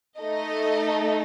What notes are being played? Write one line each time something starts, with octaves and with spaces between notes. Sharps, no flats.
A3 D#4 A4 D#5